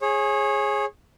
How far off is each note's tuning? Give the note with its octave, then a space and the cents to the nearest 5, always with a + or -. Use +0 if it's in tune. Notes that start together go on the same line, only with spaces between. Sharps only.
G#4 +0 C#5 -25